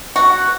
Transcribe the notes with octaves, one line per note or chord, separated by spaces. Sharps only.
F#4